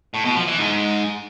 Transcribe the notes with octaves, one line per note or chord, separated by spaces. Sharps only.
A2
B2
F3
E3
G#2